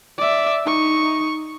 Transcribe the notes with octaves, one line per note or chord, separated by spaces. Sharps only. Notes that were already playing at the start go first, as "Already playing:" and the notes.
D5 E5
D#4 C#6